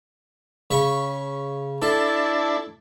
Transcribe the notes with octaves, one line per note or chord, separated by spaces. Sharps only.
C#3 B5 C#6
D4 E4 A4 A5